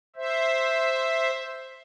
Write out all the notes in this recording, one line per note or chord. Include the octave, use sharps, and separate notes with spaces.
C5 E5